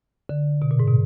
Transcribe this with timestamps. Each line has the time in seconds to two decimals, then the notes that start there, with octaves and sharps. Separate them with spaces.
0.29 D3
0.62 B2
0.71 A#2
0.80 G#2
0.87 B2